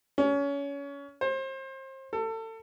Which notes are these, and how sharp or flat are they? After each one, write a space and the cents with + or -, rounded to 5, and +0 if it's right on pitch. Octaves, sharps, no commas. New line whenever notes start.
C#4 +25
C5 +30
A4 +30